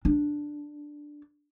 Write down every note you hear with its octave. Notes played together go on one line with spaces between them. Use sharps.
D4